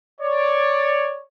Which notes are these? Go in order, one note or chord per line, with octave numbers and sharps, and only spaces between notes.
C#5 D5